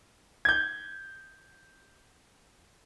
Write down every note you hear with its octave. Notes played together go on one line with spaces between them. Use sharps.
G6 G#6